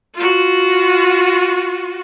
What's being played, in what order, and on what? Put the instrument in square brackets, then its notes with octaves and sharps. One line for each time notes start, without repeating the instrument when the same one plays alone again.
[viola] F4 F#4